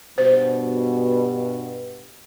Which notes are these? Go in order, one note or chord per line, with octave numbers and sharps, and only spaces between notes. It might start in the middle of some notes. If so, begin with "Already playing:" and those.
G2 B2 C5